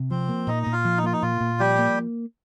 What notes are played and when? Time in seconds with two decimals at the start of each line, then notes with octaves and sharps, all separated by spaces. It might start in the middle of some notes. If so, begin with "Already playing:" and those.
Already playing: C3
0.11 F3 C4 C5
0.29 A#3
0.47 A#2 D#4 D#5
0.63 A#2 D#5
0.72 F4 F5
0.85 F3
0.98 D#4
1.03 A#3 F4
1.13 D#4
1.22 A#2 F4
1.41 A#2
1.59 F3 G3 G4
1.79 A#3